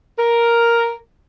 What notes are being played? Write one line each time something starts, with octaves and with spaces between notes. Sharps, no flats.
A#4